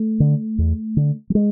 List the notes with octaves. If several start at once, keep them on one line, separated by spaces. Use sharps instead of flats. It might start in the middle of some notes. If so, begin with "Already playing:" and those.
Already playing: A3
D3
E2
D3
F#3
G#3